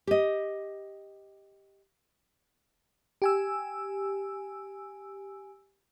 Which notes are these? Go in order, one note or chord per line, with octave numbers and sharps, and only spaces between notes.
G4 D#5
G4 G#5 E6